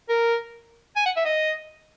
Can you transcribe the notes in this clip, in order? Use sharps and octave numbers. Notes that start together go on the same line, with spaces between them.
A#4
G#5
F#5
E5
D#5